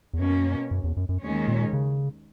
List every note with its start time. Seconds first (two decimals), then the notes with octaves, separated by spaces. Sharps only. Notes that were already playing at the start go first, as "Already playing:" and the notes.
0.14 E2
0.19 F#2 B2 A#3 C#4
0.71 F#2
0.84 E2
0.97 F#2
1.09 F#2
1.22 D#2 D#3 G#3 C#4
1.48 A#2
1.73 C#3